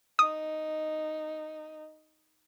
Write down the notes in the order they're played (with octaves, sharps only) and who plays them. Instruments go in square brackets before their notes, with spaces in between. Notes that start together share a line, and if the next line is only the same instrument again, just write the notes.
[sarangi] D#4 [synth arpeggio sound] D#6